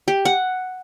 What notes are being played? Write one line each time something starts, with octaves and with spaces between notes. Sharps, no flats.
G4
F#5